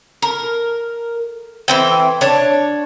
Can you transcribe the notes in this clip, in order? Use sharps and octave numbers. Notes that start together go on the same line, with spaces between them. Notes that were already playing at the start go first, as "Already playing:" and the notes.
A#4
E3 C4 G5
D4 C#5